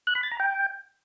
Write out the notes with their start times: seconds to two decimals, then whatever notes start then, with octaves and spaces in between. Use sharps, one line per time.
0.07 F#6
0.15 B5
0.23 A6
0.31 A#5
0.40 G5